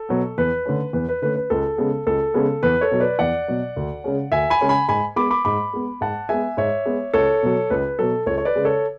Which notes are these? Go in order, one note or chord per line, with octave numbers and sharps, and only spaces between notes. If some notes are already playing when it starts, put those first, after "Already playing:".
Already playing: A4
B2 F#3 B3
E2 B4
D3 A3 C#4
E2 B4
B4
D3 A3 C#4 B4
B4
C#2 A4
C#3 G#3 B3
C#2 A4
C#3 G#3 B3
E2 B4
A4 C#5
B2 F#3
B4 D5
E2 D5 F#5
B2 F#3
D2
C#3 G#3 C#4
D2 E5 G#5
G#5 B5
C#3 G#3 C#4
G#5 B5
G#2 G#5 B5
G#3 B3 B5 D6
B5 D6
G#2 B5 D6
G#3 B3
G#2 F#5 A5
G#3 B3 E5 G#5
G#2 C#5 E5
G#3 B3
C#2 A4 C#5
B2 F#3
C#2 B4
B2 F#3 A4
C#2 A4 C#5
C#5
B4 D5
C#3 G#3
A4 C#5